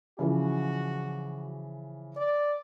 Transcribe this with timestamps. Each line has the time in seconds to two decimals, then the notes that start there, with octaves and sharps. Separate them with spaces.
0.19 C#3 E3 F3 F#4
2.17 D5